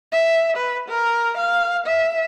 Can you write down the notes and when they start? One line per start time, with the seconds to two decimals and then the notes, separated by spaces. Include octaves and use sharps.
0.12 E5
0.57 B4
0.89 A#4
1.37 F5
1.87 E5